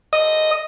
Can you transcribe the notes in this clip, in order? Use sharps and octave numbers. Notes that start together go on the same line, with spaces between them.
D#5